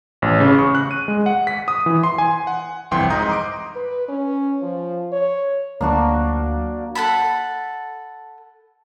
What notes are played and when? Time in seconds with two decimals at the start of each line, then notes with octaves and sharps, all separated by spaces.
0.22 A1
0.40 C#3
0.59 C#6
0.75 F#6
0.91 D#7
1.08 G#3
1.26 F#5
1.47 B6
1.68 D#6
1.86 E3
2.03 C6
2.18 G#5
2.47 F#5
2.91 G1 C2 F2 E3 G5 C6
3.10 G#2 D#5 A#5 D#6 G6
3.29 C6 D6 D7
3.76 B4
4.08 C#4
4.62 F3
5.12 C#5
5.81 D2 F#3 A#3 D4 F#4
6.95 A4 F#5 A5 B5